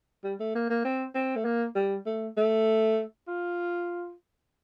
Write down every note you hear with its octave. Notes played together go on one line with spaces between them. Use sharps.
G3
A3
A#3
A#3
C4
C4
A3
A#3
G3
A3
A3
F4